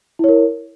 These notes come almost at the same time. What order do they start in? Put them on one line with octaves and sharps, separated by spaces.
E4 C#5 A#4